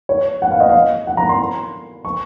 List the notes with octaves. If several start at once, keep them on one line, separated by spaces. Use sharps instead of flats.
C#5
F#5
F5
D#5
F5
F#5
A#5
C6
C#6